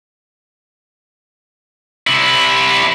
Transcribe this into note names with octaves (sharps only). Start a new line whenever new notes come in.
C3 E4